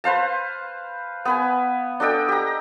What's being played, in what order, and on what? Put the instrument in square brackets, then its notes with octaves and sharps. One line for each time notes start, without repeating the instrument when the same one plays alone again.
[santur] B4 C5 F5 A5
B3 B4 G#5
D4 A4 D#5 G5
G4 A#5